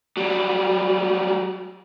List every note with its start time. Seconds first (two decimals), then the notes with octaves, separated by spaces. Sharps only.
0.17 F#3 G3